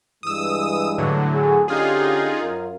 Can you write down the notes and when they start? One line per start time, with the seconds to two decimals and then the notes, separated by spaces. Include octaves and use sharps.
0.23 G2 E3 G#3 D#6 E6
0.98 A2 D3 F#3
1.33 G#4
1.68 D3 C#4 D#4 F4 G4 G#4
2.41 F#2 F4 A#4